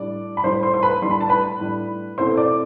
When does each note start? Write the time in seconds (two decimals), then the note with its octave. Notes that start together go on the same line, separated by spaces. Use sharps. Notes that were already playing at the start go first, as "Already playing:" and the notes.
Already playing: A2 G3 D4 D5
0.37 B5
0.44 A2 G3 D4 C5 C6
0.63 C5 C6
0.74 C6
0.82 B4 B5
1.02 A2 G3 D4 C6
1.11 B5
1.21 A5
1.29 B4 B5
1.60 A2 G3 D4
2.18 B2 A3 C4 E4 C5 C6
2.37 D5 D6